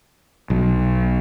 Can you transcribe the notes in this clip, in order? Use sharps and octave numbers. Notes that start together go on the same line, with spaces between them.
B1